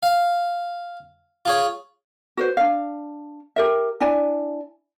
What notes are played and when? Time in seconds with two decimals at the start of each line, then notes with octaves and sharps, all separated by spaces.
0.03 F5
1.45 F4 G#4 C#5
2.37 F#4 B4 C5
2.57 D4 F5
3.56 G4 A#4 E5
4.00 D4 E4 D5 G#5